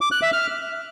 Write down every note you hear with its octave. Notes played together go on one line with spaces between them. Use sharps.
D6
F#6
E5
F6